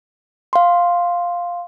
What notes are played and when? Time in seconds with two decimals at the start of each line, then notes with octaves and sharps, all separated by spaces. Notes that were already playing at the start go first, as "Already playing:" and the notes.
0.53 F5 C6